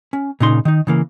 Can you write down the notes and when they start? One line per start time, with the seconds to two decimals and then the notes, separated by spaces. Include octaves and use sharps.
0.13 C#4
0.40 A#2 C#3 D#4 C6
0.65 D#3 D#4
0.87 C#3 E3 A#3